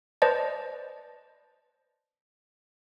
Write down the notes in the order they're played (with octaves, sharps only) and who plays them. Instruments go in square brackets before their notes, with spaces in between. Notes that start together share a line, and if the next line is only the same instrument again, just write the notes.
[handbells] B4 C5 D5 D#5 A5